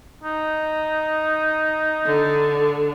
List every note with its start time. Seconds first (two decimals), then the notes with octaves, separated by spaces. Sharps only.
0.24 D#4
2.06 D3